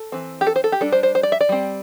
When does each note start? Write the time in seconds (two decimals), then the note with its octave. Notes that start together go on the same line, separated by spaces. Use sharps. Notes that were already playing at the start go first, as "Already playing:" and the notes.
Already playing: A4
0.12 E3 C4
0.41 G4
0.47 A4
0.56 C5
0.64 A4
0.72 G4
0.81 G3 D4 A4
0.92 C5
1.03 C5
1.15 C5
1.23 D5
1.32 E5
1.41 D5
1.49 G3 C4